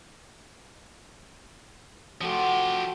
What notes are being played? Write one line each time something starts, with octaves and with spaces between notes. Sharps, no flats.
F3 A3 F#4 G4 C6